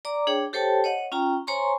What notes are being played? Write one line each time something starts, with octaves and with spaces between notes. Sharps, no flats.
D5 A#5 D6
D4 G#4 C#5 G5
G4 A4 C5 C#5 G5 A5
C#5 D#5 F#5
C#4 F4 G5 A#5
C5 C#5 G#5 A#5 C6 C#6